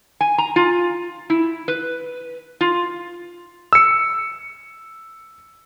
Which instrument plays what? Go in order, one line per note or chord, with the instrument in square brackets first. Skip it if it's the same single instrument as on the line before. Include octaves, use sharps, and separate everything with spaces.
[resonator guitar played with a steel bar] G#5
A#5
F4
E4
B4
F4
[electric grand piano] E6 C#7